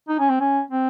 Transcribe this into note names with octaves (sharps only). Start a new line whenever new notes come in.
D#4
C#4
C4
C#4
C4